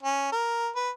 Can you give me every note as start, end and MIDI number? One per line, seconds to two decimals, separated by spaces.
0.03 0.30 61
0.32 0.69 70
0.76 0.90 71